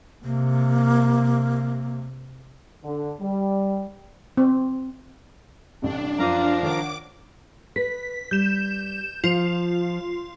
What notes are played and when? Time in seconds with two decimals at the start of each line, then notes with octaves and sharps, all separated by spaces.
0.25 C3 A#3
2.83 D3
3.20 G3
4.37 C4
5.82 A1 G2 C3 D4
6.19 F#2 F3 F5 A#5 D6 D#7
6.63 D#3 C#5 F#5 D6
7.76 B4 B6
8.31 G3 G6 E7
9.24 F3 F4